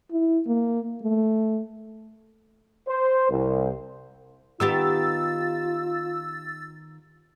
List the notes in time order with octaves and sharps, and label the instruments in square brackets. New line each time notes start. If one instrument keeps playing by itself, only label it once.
[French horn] E4
A#3
A3
[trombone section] C5
C2
[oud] D#3 B3 G4 [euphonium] F4 [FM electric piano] E6 A6